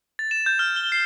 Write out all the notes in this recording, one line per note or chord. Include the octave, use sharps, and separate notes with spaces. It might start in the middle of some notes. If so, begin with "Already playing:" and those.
A6
E7
G6
F6
G7
C7